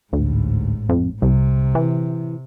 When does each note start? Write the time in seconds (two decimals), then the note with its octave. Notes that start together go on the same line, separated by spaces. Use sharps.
0.13 A1 D2 G#2
0.89 F2
1.22 C2 C3
1.75 E3